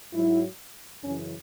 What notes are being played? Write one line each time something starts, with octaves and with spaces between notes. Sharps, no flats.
G#2 F#3 E4
F#2 C#3 E3 C#4